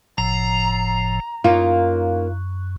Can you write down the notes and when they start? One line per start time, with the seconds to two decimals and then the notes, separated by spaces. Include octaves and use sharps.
0.18 F#1 A2 F3 A#5
1.44 F#2 A#3 C#4 D#4 F4